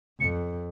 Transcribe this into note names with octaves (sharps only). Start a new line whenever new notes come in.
F2 C#7